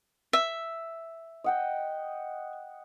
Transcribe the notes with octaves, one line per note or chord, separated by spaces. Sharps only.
E5
D#5 F#5 G5